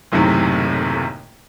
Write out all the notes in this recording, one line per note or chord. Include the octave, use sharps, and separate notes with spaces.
F#1 B1 F#2 A2 C3 D#3